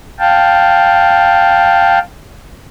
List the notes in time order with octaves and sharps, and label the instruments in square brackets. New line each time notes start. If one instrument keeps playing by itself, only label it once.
[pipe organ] F5 G5 A5